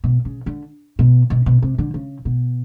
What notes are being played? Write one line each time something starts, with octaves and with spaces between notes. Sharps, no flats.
B2
C#3
D3
B2
B2
B2
C3
D3
C#3
B2